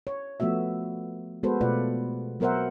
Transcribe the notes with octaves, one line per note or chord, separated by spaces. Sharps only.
C#5
F3 A3 B3 F#4 E5
G#3 B3 F#4 A4 B4 C5
B2 A3 F4 B4 D5 F#5
F#3 B3 A#4 C5 E5 F#5